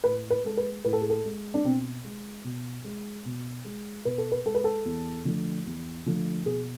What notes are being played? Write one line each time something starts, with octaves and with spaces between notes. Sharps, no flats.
A2 B4
B4
G#3 A4
B4
A2 B4
A4
G#4
A4
G#3
D4
B2 C4
G#3
B2
G#3
B2
G#3
B2 B4
A4
B4
G#3 A4
B4
A4
E2
D3 F3 A3
E2
D3 F3 A3
B2 G#4